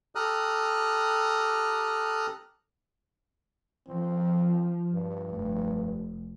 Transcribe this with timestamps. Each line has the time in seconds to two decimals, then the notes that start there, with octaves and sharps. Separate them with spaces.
0.15 G4 A4 A#5 D#6 F6 F#6
3.87 F3 C4
4.92 G2
5.32 F1